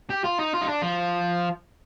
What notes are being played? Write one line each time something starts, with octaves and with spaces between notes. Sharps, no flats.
G4
F4
D#4
F4
D#4
D4
F3